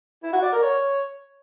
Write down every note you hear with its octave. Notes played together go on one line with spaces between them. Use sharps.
E4
F#4
D5
A#4
C#5